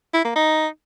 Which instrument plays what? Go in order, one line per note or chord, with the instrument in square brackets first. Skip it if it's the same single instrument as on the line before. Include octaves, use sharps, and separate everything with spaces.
[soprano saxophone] E4
A#3
D#4